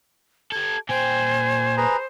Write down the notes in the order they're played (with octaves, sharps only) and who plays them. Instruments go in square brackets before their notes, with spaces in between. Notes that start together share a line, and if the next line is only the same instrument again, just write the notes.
[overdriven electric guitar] G4 A4 [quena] G#6
[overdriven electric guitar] A#2 G5 [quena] C5 [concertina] G#5
[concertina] G#4 B4 A#5